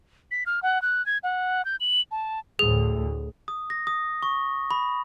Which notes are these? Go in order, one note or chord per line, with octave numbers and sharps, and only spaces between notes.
B6
F6
F#5
F#6
G#6
F#5
G6
F#7
A5
D2 A2 G#4
D#6
A#6
D#6
C#6
B5